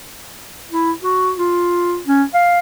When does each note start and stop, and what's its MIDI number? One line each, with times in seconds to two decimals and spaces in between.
0.71 0.92 64
1.03 1.32 66
1.38 1.99 65
2.07 2.23 61
2.34 2.59 77